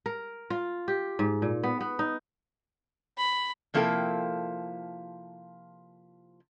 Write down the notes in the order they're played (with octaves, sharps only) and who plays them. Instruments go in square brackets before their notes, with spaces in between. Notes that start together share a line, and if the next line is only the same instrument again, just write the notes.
[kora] A#4
F4
G4
G#2
A#2
B3
B3
D#4
[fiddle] B5
[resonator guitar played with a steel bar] C3 F3 A#3 E4 A4 G5